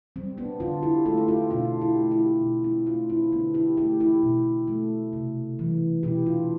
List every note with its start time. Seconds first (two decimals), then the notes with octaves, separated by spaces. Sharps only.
0.16 G3 C4
0.38 B3 D4
0.60 D3 D4 F4
0.83 E4 G4
1.05 A3 F4 A4
1.18 G4
1.28 F4 A4
1.50 B2 D4 F4
1.81 E4 G4
1.96 A3
2.11 E4 G4
2.41 B2
2.64 C4 E4
2.86 A3 D4 F4
3.09 C4 E4
3.32 D3 B3 D4
3.54 E4 G4
3.77 A3 E4 G4
4.00 E4 G4
4.23 B2
4.68 A3
5.13 C3
5.59 E3 G3
6.03 B2 E4 G4
6.26 D4 F4